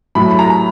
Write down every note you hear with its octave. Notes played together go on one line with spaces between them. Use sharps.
A2 F#3 B5
B5
A#5